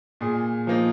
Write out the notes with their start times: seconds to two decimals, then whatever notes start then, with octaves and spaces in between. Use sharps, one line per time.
0.21 A#2 G#4
0.67 F3 A#3 D#4